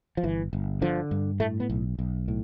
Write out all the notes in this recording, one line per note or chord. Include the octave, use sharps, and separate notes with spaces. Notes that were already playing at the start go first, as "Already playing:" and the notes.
F3
G1 E3
G1
D3 F3
G2
A2 A3
B3
B1
B1
A2